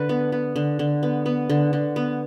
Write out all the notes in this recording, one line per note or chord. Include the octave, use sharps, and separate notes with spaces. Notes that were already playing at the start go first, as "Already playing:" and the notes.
Already playing: D3 A4 B4
B3
B3
D3
D3
B3
B3
D3
D3
B3